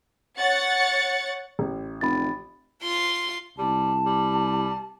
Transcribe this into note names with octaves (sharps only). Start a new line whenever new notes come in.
C#5 F#5 A6 C#7
A1
F1 B5 A6
F4 C6
C2 G3 A5
G3